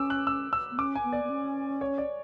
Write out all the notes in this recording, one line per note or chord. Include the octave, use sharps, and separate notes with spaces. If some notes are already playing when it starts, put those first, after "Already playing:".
Already playing: C#4 D6 E6
F#6
E6
E6
B3
C#4 D6
G#5
B3
D5
B3
C#4
C#5
D5